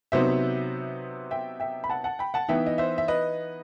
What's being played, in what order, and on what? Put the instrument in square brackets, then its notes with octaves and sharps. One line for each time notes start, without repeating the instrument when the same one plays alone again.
[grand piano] C3 F#3 B3 D#4 C5 E5
E5 G5
E5 G5
B5
F#5 A5
F#5 A5
G5 B5
F#5 A5
E3 B3 D#4 E5 G5
D#5
C5 E5
E5
B4 D#5